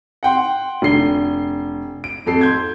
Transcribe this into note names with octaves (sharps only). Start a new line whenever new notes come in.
F#5 G5 C6
F1 D3 C7 G7
D7
F2 A4 C7
C6 G6 G#6